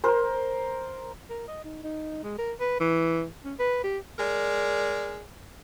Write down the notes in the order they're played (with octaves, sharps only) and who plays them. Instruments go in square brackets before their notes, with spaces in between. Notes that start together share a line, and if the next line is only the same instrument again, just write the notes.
[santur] A#4 C5
[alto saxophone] A#4
D#5
D#4
D#4
G#3
A#4
B4
E3
C#4
B4
G4
[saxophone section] G#3 A#4 D5